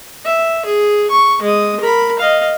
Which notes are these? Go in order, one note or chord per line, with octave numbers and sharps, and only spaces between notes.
E5
G#4
C#6
G#3 D#6
A#4 B5
D#5 F5